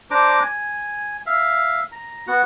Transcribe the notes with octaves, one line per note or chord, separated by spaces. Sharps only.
D4 C5 A#5 D6
G#5
E5 F5
A#5
B3 F#4 F#5